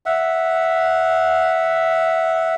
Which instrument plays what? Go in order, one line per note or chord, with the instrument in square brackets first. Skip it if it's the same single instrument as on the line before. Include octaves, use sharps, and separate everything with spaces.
[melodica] E5 F#5